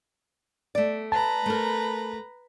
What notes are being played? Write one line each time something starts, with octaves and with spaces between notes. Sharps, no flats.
A3 D5
B4 A5 A#5
A3 A#4